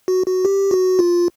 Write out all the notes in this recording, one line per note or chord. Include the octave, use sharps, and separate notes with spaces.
F#4
F#4
G4
F#4
F4